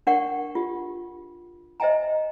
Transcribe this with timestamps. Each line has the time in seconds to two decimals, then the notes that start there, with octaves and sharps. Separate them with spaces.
0.07 D4 A#4 D5 F#5 G5 C#6
0.55 F4 G4
1.80 C5 D#5 E5 G5 G#5 A#5